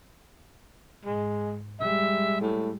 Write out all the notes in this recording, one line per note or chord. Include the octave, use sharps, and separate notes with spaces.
G#2 G#3
G3 G#3 E5
A2